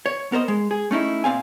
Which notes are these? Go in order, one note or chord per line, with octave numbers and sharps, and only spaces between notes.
C#5
B3 A#4 C5 D#5
G#3
G#4
A3 C#4 D#4 E4
A#2 C4 F5 G#5